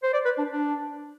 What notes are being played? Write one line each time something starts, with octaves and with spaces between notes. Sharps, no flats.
C5
D5
B4
D4
D4